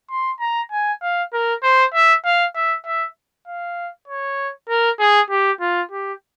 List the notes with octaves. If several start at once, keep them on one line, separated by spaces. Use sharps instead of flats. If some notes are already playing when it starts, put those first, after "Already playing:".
C6
A#5
G#5
F5
A#4
C5
E5
F5
E5
E5
F5
C#5
A#4
G#4
G4
F4
G4